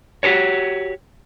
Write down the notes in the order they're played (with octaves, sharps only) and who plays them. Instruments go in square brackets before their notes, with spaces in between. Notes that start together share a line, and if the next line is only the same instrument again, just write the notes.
[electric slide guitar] F#4 G4 A4 A#4 C#5